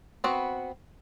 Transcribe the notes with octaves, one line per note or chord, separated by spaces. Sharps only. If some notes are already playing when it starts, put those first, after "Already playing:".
B3 C4 F#4 B4